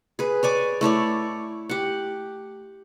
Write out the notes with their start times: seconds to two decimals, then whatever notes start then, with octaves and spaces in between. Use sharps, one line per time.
0.19 G#4 B4
0.43 C#5 D5 G#5 D6
0.81 A3 E4 C#5 D5
1.69 G4 F#5